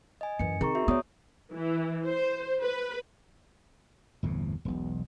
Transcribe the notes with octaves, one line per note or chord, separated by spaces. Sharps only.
D#5 G#5
F#2 E3 C#7
D#3 C4 G#4 A#5 C#6
F#4 E5
B3 C#5 D5 D#6
E3
C5
B4
G1 E2 A2 C3
E1 B1